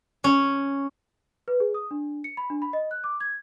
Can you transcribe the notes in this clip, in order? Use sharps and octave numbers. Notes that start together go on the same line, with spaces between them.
C#4
B4
G#4
D#6
D4
C#7
B5
D4
B5
D#5
F#6
D6
G#6